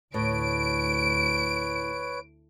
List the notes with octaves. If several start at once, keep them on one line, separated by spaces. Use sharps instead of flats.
D2 A2 B4 C#5 D7